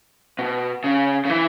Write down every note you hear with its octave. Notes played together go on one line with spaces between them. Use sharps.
B2
C#3
C#3
E3